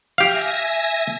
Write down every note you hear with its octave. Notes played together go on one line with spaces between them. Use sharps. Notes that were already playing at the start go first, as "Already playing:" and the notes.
G4 E5 F5 G#5 A#6